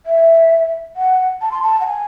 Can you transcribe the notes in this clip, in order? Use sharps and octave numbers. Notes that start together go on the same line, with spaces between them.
E5
F#5
A5
C6
A5
F#5
G#5